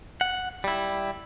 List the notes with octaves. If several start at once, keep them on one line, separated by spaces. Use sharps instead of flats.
F#5
G3 E4